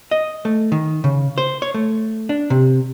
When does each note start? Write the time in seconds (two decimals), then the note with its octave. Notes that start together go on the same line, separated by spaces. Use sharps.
0.11 D#5
0.45 A3
0.72 D#3
1.04 C#3
1.38 C5
1.62 C#5
1.74 A3
2.29 D4
2.50 C3